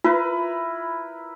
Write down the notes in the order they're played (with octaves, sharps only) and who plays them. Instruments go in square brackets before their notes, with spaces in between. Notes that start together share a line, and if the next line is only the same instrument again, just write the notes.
[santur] E4 A#4 B4 [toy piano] F4